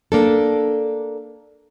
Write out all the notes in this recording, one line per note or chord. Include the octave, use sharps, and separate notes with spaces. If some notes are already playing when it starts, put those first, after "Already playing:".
A#3 D4 A4